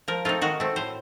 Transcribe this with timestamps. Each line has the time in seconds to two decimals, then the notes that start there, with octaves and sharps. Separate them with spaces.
0.08 F3 A#4
0.25 A3 C4 D#4 F4
0.41 D#3 F#4
0.60 A3 C4
0.76 A2 C5